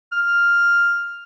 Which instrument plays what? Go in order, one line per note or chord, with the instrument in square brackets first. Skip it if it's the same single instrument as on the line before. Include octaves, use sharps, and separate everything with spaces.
[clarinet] F6